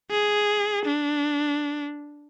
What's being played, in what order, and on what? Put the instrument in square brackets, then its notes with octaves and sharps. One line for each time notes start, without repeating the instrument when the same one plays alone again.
[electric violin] G#4
D4